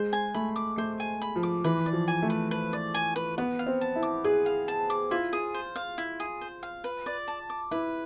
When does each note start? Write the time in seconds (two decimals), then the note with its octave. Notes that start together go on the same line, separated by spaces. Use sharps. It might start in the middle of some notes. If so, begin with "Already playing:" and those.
Already playing: G#3 C5
0.13 G#5
0.34 A3 B5
0.56 D6
0.77 A3 C5
1.00 G#5
1.22 B5
1.36 F3
1.43 D6
1.64 E3 B4
1.86 D5
1.93 F3
2.08 G#5
2.22 A3
2.30 B4
2.51 B4
2.73 D5
2.94 G#5
3.16 B4
3.38 B3 B4
3.59 F5
3.66 C4
3.81 A5
3.96 E4
4.03 D6
4.24 G#4 B4
4.46 F5
4.68 A5
4.90 D6
5.11 E4 F4
5.33 G#4
5.54 C5
5.76 F5
5.98 E4
6.20 G#4
6.41 C5
6.63 F5
6.84 B4
7.06 D5
7.28 A5
7.50 D6
7.71 E4 B4